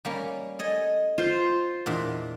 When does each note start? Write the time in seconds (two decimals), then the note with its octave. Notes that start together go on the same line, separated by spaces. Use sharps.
0.05 G3 A#3 C#4
0.59 A4 D#5 G#5
1.18 F4 C5
1.86 E2 A#2 D4